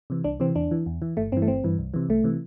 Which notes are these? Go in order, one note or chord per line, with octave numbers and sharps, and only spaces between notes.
C3 E3
C2 D4
C3 E3 C4
E2 D4
E3
E2
E3
G1 A3
G2 E3 C4
A3
G1 C4
G2 E3
C2
C3 E3
C2 A3
C3 E3